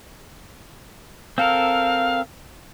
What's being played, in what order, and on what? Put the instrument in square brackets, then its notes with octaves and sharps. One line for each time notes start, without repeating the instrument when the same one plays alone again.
[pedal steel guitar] C4 A4 A#4 [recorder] F5